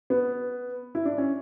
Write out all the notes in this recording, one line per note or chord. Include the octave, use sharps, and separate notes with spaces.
B3
E4
D4
C#4